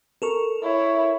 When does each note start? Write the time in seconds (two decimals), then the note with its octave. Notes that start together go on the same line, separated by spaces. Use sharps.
0.22 A4 A#4 C#6
0.63 E4 C#5